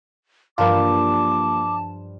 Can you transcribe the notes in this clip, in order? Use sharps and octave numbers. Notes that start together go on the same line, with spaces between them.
G2 F3 G3 A#3 F4 A5 D6